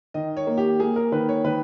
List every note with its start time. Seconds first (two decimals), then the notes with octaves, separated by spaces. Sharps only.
0.14 D#3 D#5
0.37 C#5
0.47 A#3
0.58 G4
0.79 A#3 G#4
0.96 A#4
1.12 D#3 B4
1.29 C#5
1.44 D#3 B4